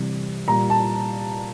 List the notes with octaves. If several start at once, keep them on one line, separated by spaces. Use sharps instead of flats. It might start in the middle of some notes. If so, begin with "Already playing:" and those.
Already playing: C3 E3 G3
A#2 G3 A#5
A5